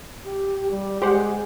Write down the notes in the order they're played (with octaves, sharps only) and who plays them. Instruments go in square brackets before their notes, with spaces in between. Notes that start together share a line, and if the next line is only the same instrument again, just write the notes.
[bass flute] G4
G3
[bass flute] G#3 [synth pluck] G4 C5 F#5